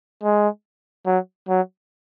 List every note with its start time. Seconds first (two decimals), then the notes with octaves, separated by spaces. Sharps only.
0.23 G#3
1.06 F#3
1.48 F#3